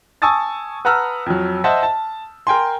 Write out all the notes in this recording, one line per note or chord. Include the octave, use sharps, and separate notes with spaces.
G#5 A5 C#6 D#6 E6 A6
B4 F#5 A5 A#5 E6 F6
F2 F#3
C5 D#5 E5 F#5 A5
A5
A#4 G5 G#5 C6